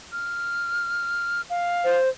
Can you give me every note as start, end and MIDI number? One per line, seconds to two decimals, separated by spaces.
0.12 1.42 89
1.50 1.98 77
1.84 2.09 72